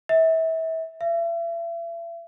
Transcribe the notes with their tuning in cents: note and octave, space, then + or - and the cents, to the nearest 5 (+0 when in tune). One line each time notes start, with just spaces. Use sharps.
E5 -30
E5 +40